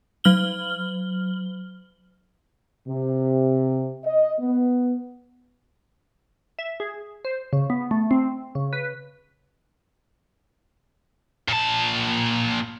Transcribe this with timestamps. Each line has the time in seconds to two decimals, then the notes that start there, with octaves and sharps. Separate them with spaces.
0.24 F#3 F6 F#7 G7
2.87 C3
4.05 D#5
4.40 B3
6.59 E5
6.80 G#4
7.25 C5
7.53 C#3
7.70 B3
7.91 A3
8.11 C4
8.55 C#3
8.73 B4
11.48 A#2 A5